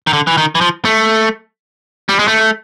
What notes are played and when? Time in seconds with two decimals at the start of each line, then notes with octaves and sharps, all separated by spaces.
0.07 D#3
0.13 D3
0.27 E3
0.37 D#3
0.55 E3
0.61 F3
0.85 A3
2.09 G3
2.19 G#3
2.28 A3